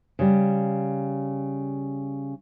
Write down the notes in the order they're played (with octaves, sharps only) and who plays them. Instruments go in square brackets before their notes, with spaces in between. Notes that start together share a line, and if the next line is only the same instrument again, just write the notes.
[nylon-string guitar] C#3 G3